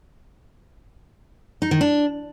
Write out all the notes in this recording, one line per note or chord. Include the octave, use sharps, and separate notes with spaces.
D#4
D#3
D4